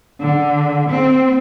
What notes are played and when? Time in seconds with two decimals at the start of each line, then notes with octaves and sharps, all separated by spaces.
0.20 D3
0.90 C4